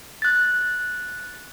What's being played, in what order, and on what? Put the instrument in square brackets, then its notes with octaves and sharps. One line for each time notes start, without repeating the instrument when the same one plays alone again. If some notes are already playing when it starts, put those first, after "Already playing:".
[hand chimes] F#6 A6